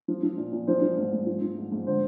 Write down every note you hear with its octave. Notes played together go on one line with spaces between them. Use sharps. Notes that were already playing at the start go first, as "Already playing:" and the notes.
F3
F3
A#2
A#2
F3 C5
F3
G#2
G#2
F3
F3
G#2
G#2
D3 C5